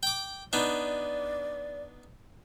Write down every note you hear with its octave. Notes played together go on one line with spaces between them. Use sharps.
G5 D6
B3 D4 D#4 D5